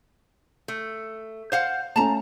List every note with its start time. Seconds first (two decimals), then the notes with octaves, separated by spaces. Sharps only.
0.68 A3
1.52 C5 F5 F#5
1.96 A3 C#4 A5 A#5